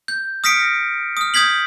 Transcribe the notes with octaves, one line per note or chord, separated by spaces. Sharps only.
G6
D#6 F6 A#6 B6 C#7 D7
D#6 F6
D#6 G6 G#6 B6 F#7